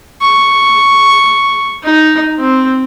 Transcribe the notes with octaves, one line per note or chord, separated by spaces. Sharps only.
C#6
D#4
C4